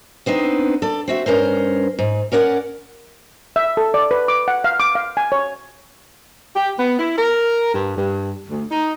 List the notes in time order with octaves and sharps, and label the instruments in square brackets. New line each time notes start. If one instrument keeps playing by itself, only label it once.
[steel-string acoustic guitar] B3 C4 D4 D#4
A4 D5
C4 F#4 E5
G2 C#4 A#4 C5
G#2
C#4 A#4 D5 F#5
[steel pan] E5
A4
D5
B4
D6
F#5
F5
D6
F5
G#5
C#5
[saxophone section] G4
B3
E4
A#4
G2
G2
D2
D#4